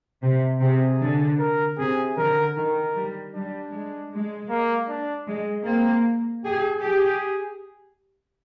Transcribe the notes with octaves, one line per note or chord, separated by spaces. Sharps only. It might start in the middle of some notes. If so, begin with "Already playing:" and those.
C3
C3 G#4
D3
A#4
C3 G#4
D3 A#4
D#3 A#4
G3
G3 D4
G#3
G#3
A#3
D4
G#3
A#3 C4
G4 G#4
G4 G#4